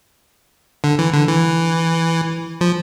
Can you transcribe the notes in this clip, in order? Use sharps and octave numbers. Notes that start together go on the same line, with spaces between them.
D3
E3
D3
E3
F3